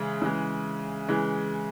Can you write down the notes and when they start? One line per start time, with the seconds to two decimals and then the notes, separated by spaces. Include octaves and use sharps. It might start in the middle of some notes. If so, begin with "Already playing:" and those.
Already playing: C#3 E3 G#3
0.22 C#3 E3 G#3
1.09 C#3 E3 G#3